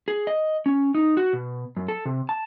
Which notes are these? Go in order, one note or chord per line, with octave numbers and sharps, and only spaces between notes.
G#4
D#5
C#4
D#4
F#4
B2
F#2
A4
C3
A5